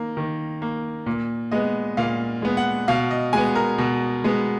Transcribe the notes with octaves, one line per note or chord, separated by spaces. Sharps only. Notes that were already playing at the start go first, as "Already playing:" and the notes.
Already playing: D#3 A#3
D#3
A#3
A#2
G#3 B3 D#5
A#2 F5
G#3 B3
F#5
B2 F5
D#5
G#3 B3 G#5
A#4
B2
G#3 B3